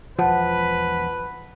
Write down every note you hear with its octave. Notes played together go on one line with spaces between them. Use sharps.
E1 F3 B4 F#5 A5